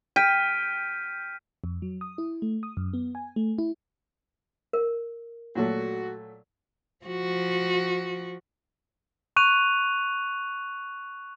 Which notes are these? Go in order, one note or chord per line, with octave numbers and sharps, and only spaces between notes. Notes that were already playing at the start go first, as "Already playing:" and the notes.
G5 F6 B6 D#7
F2
F#3
D#6
E4
A3
D#6
F#2
B3
G#5
A3
E4
A#4
A#2 F#3 A3 F#4
F3 F#4
C#6 F#6 D#7 F7